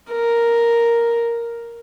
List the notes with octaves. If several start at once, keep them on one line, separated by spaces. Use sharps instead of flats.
A#4